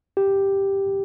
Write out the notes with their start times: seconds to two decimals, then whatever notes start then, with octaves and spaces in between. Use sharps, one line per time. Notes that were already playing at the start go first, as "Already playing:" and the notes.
0.17 G4